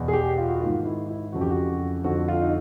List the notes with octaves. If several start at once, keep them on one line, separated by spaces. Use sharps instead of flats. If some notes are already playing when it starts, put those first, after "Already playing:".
Already playing: E2 B2
G#4
G4
F4
F#4
G#2 D#3 F4
E4
E4
F2 C#3 E3 F#4
G4
F#4
F2 D3 F#4
F4
D#4